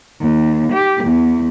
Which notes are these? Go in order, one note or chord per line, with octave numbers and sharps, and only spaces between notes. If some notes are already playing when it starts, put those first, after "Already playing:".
D#2
G4
E2